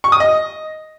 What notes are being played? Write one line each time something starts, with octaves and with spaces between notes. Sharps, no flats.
C#6
D#6
D#5